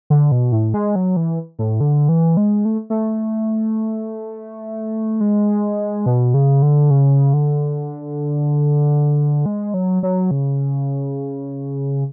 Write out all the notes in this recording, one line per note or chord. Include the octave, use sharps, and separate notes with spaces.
D3
B2
A2
G#3
F#3
E3
A2
D3
E3
G#3
A3
A3
G#3
B2
C#3
D3
C#3
D3
G#3
F#3
F#3
C#3